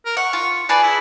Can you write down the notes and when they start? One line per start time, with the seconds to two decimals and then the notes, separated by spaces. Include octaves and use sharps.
0.05 A#4
0.17 F#5 C#6
0.33 F4
0.69 G#4 B4 D5 A5
0.82 E4